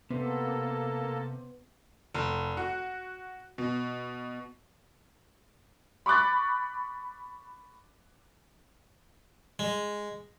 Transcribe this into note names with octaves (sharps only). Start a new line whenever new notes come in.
C3 A#3 B3 A4
F1
F#4
B2
B5 C#6 D6 F#6 A6
G#3